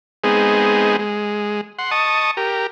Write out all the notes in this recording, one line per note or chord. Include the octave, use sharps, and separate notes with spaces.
G#3 B3 C4 D#4 G#4
G#3
F#5 C6
D#5 A5 C#6 D#6
G4 A#4